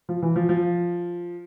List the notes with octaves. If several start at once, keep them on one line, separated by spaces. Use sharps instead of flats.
F3
E3
F3
F3